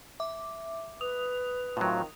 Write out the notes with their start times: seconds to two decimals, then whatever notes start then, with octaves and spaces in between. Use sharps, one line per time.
0.20 E5 D6
1.01 B4 D#6 F7
1.77 A2 D#3 F#3 C4 F4